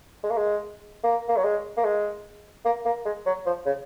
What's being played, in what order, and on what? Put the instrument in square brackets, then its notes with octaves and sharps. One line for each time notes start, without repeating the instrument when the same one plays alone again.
[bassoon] G#3
A#3
G#3
A#3
A#3
F#3
G#3
A#3
G#3
A#3
A#3
G#3
F#3
F3
C#3